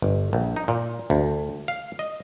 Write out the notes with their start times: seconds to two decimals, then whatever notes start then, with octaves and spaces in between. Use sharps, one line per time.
0.02 G1
0.33 A#1
0.56 D#4
0.68 A#2
1.10 D2
1.68 F5
1.99 D#5